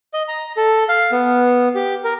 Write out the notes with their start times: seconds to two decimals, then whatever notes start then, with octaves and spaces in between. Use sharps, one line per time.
0.14 D#5
0.28 A#5
0.57 A4
0.89 F5
1.12 B3
1.75 G4
2.04 A#4